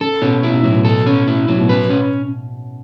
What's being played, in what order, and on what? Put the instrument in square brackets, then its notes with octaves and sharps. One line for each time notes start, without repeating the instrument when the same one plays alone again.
[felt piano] C#3 [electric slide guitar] A4
[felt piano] B2 [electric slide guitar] C#4
[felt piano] C#3 [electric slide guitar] E4
[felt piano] B2
[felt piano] A2 [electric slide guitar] F#3
[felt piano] B2
[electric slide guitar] A4
C#4
E4
[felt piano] A2 [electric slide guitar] F#3
[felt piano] B2
[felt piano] C#3 [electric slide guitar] B4
[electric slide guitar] C#4